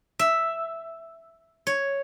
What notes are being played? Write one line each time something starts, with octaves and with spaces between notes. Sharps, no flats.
E5
C#5